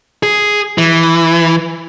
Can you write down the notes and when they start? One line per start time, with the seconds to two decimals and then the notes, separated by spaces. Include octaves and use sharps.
0.23 G#4
0.78 E3